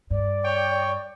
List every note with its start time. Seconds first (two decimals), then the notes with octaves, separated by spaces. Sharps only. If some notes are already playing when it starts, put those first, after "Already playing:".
0.10 G2 D5
0.45 C#5 G5